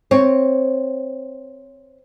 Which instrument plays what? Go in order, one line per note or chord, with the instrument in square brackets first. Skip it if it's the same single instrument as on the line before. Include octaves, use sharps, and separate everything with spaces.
[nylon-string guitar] C4 C#5